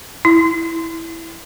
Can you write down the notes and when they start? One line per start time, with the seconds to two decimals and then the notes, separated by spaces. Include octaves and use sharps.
0.25 E4